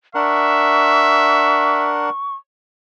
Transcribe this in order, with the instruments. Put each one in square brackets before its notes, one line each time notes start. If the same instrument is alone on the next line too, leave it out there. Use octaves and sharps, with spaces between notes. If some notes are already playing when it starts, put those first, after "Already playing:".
[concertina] D4 A#4 F#5 [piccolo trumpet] E5 [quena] C#6